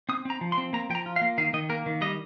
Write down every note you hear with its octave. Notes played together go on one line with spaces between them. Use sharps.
C4 D#6
C4 A#5
F3
C6
C4
A#3 A#5
F3 G5
A#5
F4
F5
A#3
D#3 F5
D#3 D#5
A#3 A#4
D#3
G3 D#5